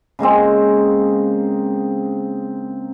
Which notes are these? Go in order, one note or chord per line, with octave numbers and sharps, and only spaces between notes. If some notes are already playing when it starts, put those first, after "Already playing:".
C#3 G#3 A#3 C4